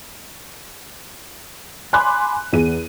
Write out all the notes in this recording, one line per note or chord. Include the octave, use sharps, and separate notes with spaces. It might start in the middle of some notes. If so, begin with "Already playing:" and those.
G#5 B5 C6 D6 F#6
E2 G#4 D#7